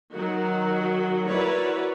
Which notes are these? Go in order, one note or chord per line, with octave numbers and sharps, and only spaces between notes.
D#3 F#3 F#4
E4 F#4 A#4 B4 C#5 D5